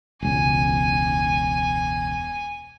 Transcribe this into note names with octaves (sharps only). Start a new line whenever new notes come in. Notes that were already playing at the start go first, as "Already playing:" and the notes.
E1 C#2 G#5